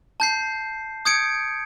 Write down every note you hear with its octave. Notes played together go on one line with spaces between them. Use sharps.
A5 G6 C7
D#6 G6 G#6 C#7 D7